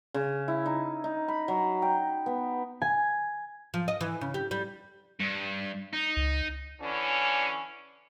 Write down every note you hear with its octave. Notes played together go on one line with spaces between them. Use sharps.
C#3
E4
D#4
D#4
B5
F#3
G5
B3
G#5
F3
D#5
E3
C#3
G4
G3
G2
D#4
C#2
D3 E3 C#4